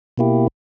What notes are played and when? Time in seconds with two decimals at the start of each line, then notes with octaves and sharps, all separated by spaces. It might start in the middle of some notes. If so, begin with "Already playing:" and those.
0.18 B2 A#3 E4 G4